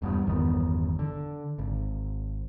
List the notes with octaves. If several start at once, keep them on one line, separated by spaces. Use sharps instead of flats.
E1 G2 B3
G1 E2 D#3 B3
D3
G#1